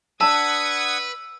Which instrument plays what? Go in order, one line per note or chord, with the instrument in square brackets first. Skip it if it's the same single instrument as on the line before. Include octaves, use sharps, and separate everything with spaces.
[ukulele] D4 A5 [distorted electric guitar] B4 [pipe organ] F#5 D#6 G#6 [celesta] E6